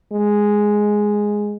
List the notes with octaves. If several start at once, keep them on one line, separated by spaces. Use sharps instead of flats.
G#3